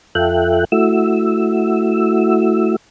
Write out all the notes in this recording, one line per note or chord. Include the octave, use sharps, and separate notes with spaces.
F2 F4 A4 E5 G5 F#6
A3 E4 F#4 E6